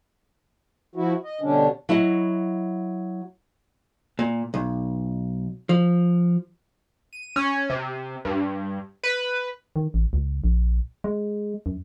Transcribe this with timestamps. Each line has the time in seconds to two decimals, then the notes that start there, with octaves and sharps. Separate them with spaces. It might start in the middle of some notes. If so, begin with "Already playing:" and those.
0.95 F3 E4 F#4
1.23 D#5
1.41 B2 D3 G3 C#4 D4
1.89 F#3 E4 F#4 D#5
4.19 A#2
4.54 B1
5.69 F3
7.13 D#7
7.36 C#4
7.70 C3
8.25 G2
9.04 B4
9.76 D#3
9.94 A1
10.13 C#2
10.44 A#1
11.04 G#3
11.66 F#2